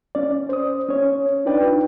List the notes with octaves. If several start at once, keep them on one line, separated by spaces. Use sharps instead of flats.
C#4 D5
C5 D#6
C#4 C#5
D4 D#4 F4 B4 D5 G5